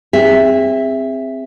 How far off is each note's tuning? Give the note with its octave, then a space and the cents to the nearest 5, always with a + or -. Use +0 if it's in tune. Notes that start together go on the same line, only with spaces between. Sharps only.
C4 +0 G#4 -25 E5 +0